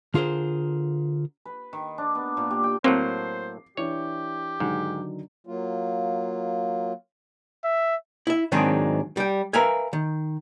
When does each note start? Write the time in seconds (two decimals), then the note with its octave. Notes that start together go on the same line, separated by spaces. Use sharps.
0.14 D3 F4 G#4 A#4 C5
1.45 B4
1.73 D#3
1.98 D4
2.15 B3
2.37 A#2
2.51 G4
2.63 G5
2.84 A2 F#3 A#3 C4 C5 D6 C7
3.77 E3 D4 E4 G4 C#5
4.60 G#2 D3 D#3 F#3
5.47 F#3 A#3 F4
7.64 E5
8.27 E4 E5
8.52 G#2 D#3 F#3 G#3 C4 D4
9.17 G3 G5
9.53 A#4 B4 E5 F5 G#5
9.93 D#3